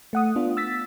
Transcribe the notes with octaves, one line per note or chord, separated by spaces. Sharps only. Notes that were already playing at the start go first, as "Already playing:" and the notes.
A3 F#5 D#6
B3 D4 F4
E6 A6 B6